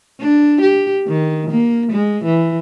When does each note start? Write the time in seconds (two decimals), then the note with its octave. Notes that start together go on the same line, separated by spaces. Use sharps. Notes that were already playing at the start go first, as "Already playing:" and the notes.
0.21 D4
0.62 G4
1.07 D#3
1.51 A#3
1.92 G#3
2.25 E3